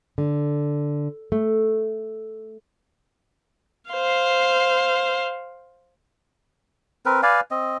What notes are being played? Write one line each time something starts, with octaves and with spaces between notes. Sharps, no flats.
D3
A3
C5 F5
C4 A#4 B4
B4 D5 F5 G#5
C4 D#5